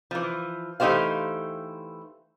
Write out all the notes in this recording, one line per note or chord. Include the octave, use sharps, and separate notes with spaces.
E3 F3
E3 A3 D#4 G4 C5 F5